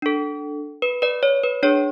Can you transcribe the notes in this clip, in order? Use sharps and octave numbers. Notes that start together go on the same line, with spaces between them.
D4 A4
B4
B4 D5
C#5
B4
D4 G#4 C#5